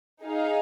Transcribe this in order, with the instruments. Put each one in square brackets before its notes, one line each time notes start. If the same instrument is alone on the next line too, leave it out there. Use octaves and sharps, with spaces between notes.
[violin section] D#4 G#4 F5